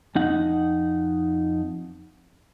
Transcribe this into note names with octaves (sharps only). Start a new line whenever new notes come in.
F2 D#4 F#5